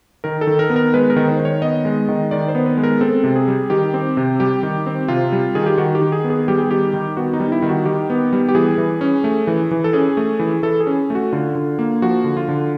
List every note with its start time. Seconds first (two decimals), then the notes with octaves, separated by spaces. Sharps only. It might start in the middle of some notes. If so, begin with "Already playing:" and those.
0.24 D#3 A#4
0.41 A4
0.47 D#3
0.59 A#4
0.70 B3
0.76 A#4
0.94 G#3 B4
1.10 A#4
1.16 D#3
1.28 C5
1.40 D#3
1.45 C#5
1.62 B3 D#5
1.85 G#3
2.09 D#3
2.31 D#3 D5
2.48 C5
2.55 B3
2.66 B4
2.77 G#3
2.83 A#4
3.01 C4 A4
3.24 C3
3.36 G#4
3.48 G3
3.70 D#3 G4
3.94 C4
4.17 C3
4.40 G3 G4
4.63 D#3
4.86 C4
5.08 C3 F4
5.32 G3
5.55 D#3 G#4
5.66 G4
5.78 D#3 F#4
5.95 G4
6.02 D#3
6.12 G#4
6.24 B3
6.30 G#4
6.48 G3 G4
6.58 G#4
6.71 D#3 G4
6.93 D#3
7.17 B3 F#4
7.33 D#4
7.40 G3
7.52 E4
7.62 D#3
7.69 F#4
7.85 D#3 G4
8.10 B3
8.33 G3
8.49 G4
8.55 E3 G#4
8.78 E3
9.01 C#4
9.24 A3
9.47 E3
9.71 E3
9.84 A4
9.93 C#4 G#4
10.17 A3
10.40 E3
10.63 E3 A4
10.80 G#4
10.87 C#4
11.10 A3
11.15 F#4
11.33 D3 F4
11.55 D3
11.79 A#3
12.02 F3 F#4
12.24 D3
12.37 F4
12.49 D3